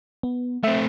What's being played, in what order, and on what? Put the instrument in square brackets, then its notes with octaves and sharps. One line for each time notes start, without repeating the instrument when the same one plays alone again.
[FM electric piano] B3
[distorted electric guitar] A3 C4 [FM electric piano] E5